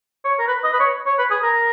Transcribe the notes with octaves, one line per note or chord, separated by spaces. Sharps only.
C#5
A#4
B4
D#5
B4
C#5
C#5
B4
G#4
A#4